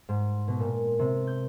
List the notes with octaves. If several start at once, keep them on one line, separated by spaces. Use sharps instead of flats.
G#2
B2
A#2
C3
G6